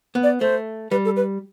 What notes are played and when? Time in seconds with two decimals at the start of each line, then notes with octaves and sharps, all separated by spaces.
0.15 B3
0.23 D5
0.40 A3 C5
0.91 G3 B4
1.05 A4
1.16 B4